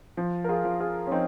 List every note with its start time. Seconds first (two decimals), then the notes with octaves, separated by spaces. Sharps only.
0.17 F3
0.44 A#4
0.49 F4 G#4
0.65 F3
0.80 F4 G#4
1.07 C#4
1.11 F3 C4 D#4